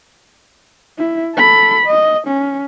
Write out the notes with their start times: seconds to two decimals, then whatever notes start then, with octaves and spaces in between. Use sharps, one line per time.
0.98 E4
1.36 A4 B5
1.86 D#5
2.27 C#4